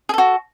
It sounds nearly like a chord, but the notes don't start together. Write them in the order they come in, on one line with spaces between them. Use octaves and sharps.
G#4 A4 F#4